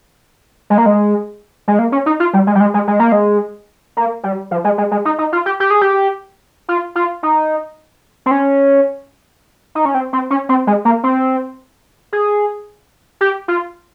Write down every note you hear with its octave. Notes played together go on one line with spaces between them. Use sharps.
G#3
A#3
G#3
G#3
A#3
C#4
D#4
F4
G3
G#3
G3
G#3
G#3
G#3
A#3
G#3
A#3
G3
F3
G#3
G#3
G#3
D#4
D#4
F4
G4
G4
G#4
G4
F4
F4
D#4
C4
C#4
D#4
C#4
C4
C4
C#4
C4
G#3
A#3
C4
G#4
G4
F4